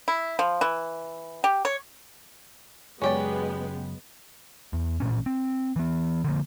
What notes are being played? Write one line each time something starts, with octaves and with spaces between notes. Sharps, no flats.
E4
F3
E3
G4
C#5
F#2 C#3 F#3 G#3 B3 C#4 G4 D5
E2
A1 A#2 C#4
C4
E3 B3
D3 F3 A#3